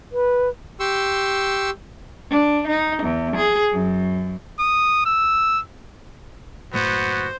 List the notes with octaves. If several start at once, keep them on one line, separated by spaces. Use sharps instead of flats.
B4
G4 C6 C#6 E6
D4
D#4
E2
G#4
F#2
D#6
E6
F#1 A2 A3 B3 F#4 C5